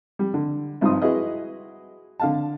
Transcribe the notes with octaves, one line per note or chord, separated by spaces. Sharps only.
G3
D3
G#1 G2 F3 D#4 C6 D#6
E4 F#4 G#4 B4 D#5
D3 F5 A5